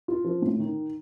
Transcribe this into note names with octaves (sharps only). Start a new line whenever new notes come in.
F4
F3
A2
D#3